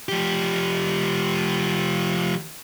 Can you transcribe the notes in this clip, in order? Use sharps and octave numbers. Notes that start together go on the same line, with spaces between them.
F3 G4